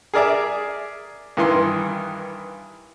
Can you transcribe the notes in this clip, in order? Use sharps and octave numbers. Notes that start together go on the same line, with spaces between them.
G#4 A#4 D5 E5
G2 D#3 E3 C6